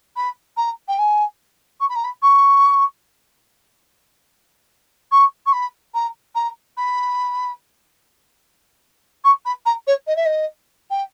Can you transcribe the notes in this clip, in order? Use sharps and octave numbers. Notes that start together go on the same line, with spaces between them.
B5
A#5
G5
G#5
C#6
B5
A#5
B5
C#6
C#6
C#6
B5
A#5
A#5
B5
C#6
B5
A#5
C#5
D#5
E5
D#5
G5